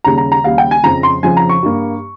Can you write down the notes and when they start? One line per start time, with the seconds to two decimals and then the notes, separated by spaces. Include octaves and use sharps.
0.04 D#2 C#3 G3 A#5
0.18 A#5
0.32 A#5
0.44 D#2 C#3 G3 F5
0.58 G5
0.71 G#5
0.83 F2 C#3 F3 A#5
1.03 C6
1.23 F2 C#3 F3 G#5
1.37 A#5
1.49 C#6
1.63 G2 G3 A#3